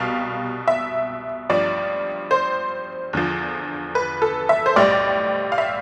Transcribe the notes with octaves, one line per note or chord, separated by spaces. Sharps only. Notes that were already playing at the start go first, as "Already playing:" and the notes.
Already playing: C2 B2 G3 F5
E5
A1 G2 F3 D5
C5
E2 D3 F3
B4
A4
E5
C5
B1 A2 G3 D5
F5
E5